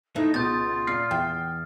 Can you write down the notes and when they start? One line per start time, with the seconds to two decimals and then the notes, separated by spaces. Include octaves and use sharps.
0.16 A2 A3 D#4
0.34 C#2 B2 F4 D#6 G6 A6
0.87 A#2 F6 C7
1.11 E2 G5